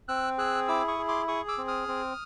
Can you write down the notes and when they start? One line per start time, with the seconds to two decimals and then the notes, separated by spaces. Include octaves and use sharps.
0.08 C4 E6 F#6
0.38 G#4 E6 F#6
0.68 E4 D6 E6
0.88 C#6 D#6
0.99 G#4
1.08 C6 D6
1.28 G#4 C#6 D#6
1.48 D6 E6
1.58 C4
1.68 D#6 F6
1.88 C4